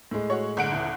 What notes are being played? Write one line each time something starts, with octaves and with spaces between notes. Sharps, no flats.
A2 G#3
F#4 C#5
G1 F#5 D7
D#1 E4